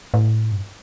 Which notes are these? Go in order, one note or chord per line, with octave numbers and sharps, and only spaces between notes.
A2
G2